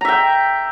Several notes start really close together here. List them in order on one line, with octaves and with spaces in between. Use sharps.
A#5 E5 G5